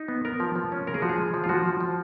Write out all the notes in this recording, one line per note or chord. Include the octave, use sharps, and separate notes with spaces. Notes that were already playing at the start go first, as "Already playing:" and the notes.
Already playing: D#4
B3
B3 A#4
F3
F3
C#4
C#3 A#4
G#4
F3 F#4
G#4
G#3
F3
F4
F3 F#4
F3
F3